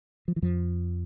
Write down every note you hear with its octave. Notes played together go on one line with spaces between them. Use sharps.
F3
E3
F2 F3